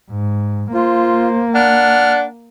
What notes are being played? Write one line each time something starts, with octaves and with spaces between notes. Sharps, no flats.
G#2
A#3 F4 C5
D4 F#5 F6